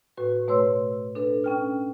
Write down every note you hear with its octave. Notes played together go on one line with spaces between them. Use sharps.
A2 F#4 B4
B2 A3 B4 C#5 C6 E6
D4 A4 B4
C#4 G5 F6